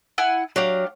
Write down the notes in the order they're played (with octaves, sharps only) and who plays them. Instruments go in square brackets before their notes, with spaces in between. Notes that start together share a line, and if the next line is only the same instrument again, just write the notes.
[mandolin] E4 F#5 G#5
[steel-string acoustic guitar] F#3 [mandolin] D4 G4 F5